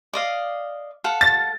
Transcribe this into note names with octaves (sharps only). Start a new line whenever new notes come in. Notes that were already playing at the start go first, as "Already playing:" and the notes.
D5 D#5 F5
A4 F5 F#5
A6